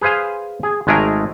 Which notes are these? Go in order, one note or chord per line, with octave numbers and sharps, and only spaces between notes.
G#4 B4 C5 F5 G#5
G#4
G#1 G#3 A3 G#4 A#4 A#5